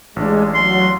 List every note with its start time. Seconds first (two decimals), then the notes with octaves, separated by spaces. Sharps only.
0.16 A1 G#3 D4
0.55 F#3 C6